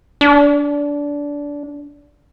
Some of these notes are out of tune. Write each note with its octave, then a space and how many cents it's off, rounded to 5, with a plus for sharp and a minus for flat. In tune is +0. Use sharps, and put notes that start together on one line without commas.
D4 -20